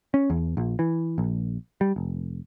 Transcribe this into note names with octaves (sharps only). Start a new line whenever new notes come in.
C#4
E2
A#1
E3
A#1
G3
F1